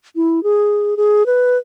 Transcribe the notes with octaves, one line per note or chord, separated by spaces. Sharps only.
E4
G#4
G#4
B4